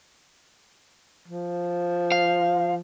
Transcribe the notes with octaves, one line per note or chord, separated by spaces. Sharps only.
F3
F5